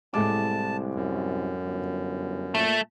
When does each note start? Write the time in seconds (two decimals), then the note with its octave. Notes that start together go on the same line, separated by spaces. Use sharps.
0.14 C2 A2 G#3 A5 D6
0.95 F#2
1.65 G1
2.55 A#2 A3